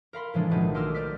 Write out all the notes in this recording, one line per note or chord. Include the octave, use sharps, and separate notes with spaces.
A#4 F5 B5 C6
A2 E3 F3 G#3 D4
B1 D#3 F3 G#3 A3 B3
A#4 D#5 C6 D6 E6 F6
C5 D5 D6 F6 B6